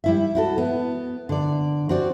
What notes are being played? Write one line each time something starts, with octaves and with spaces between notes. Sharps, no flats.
G3 E4 E5
E4 F#4 A4
B3
D3 D5
C4 F#4 D5